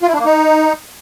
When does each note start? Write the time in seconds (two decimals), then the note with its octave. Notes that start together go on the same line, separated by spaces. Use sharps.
0.02 F4
0.08 E4
0.14 D4
0.19 A#3
0.25 D#4